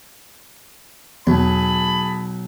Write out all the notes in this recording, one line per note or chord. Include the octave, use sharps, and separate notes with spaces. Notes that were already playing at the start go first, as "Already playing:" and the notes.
B1 E2 G#4 A5 B5